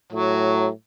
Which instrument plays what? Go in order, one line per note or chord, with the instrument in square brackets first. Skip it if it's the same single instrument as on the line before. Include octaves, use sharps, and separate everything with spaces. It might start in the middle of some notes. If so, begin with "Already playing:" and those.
[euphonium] A2 [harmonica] F#3